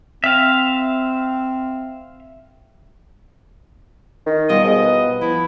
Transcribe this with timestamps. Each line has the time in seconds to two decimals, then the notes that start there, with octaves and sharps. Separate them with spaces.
0.24 C4 E5 F5
4.26 D#3
4.49 B2 G3 F4 D#5
4.64 G#2 D#5
4.85 B3
5.21 F3 E4